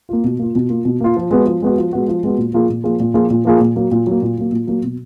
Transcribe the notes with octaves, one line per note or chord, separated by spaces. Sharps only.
A#3 F4
B2
A#3 F4
B2
A#3 F4
B2
A#3 F4
F3
G#3 B3 F#4
F3
G#3 B3 F#4
F3
G#3 B3 F#4
F3
G#3 B3 F#4
A#2
F3 A#3 F4 G#4
A#2
F3 A#3 F4 G#4
A#2
F3 A#3 F4 G#4
A#2
F3 A#3 F4 G#4
A#2
F#3 A#3
A#2
F#3 A#3
A#2
F#3 A#3
A#2
F#3 A#3
B2